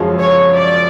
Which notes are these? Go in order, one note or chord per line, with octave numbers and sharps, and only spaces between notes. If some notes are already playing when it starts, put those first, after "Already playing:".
Already playing: F#2 C#3 F3 G#3 C#4
C#5
D5